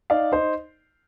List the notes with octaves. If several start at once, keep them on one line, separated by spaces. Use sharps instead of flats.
D#4 D5 F5
D#4 C5 D#5